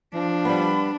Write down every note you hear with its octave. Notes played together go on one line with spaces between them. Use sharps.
F3 D4
G3 B3 B5